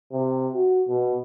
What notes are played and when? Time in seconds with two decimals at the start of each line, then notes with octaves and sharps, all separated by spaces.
0.12 C3
0.54 F#4
0.89 B2